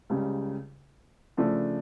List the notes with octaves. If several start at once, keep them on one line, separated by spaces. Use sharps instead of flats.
C#2 C#3 G3
C#3 F3 A3 D4